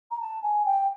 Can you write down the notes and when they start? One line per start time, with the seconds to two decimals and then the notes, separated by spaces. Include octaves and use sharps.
0.11 A#5
0.19 A5
0.42 G#5
0.65 G5